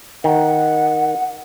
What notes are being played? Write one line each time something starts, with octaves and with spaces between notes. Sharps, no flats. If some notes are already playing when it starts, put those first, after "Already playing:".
D#3 F#5